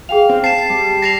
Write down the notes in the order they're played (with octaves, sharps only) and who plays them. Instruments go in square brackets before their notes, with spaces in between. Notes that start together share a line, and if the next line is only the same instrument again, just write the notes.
[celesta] G#4 G5 F7 [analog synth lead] F5
[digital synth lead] C4
[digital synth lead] A5 [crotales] C7 E7
[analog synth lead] G3
[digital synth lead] A5 [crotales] A#6 C7 F7